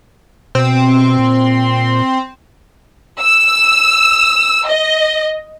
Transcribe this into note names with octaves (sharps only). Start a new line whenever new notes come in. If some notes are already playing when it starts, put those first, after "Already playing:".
B2 C4
A#2
E6
D#5